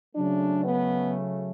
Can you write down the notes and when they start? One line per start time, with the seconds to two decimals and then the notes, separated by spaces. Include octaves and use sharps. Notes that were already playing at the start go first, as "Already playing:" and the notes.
0.15 C#3 F#3 A3 D4
0.65 B3